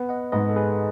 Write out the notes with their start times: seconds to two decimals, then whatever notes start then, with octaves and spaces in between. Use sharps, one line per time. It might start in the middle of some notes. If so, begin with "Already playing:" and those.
Already playing: B3
0.09 D#5 F#5
0.32 G#2 B4 D#5
0.49 A4
0.56 G#4 B4